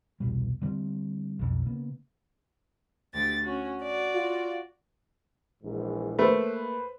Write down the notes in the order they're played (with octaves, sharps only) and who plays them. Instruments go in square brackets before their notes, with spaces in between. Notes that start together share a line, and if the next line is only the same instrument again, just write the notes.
[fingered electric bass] E1 C2 B2 G3
D3 G3 A#3 C4
B1 F2
C#3 A#3 B3
[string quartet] D2 G4 A6
C#4 F#4
F#4 D5
[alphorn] F4
[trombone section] A#1 G#2 E3
[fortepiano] A3 [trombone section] A#3 [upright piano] B4 C5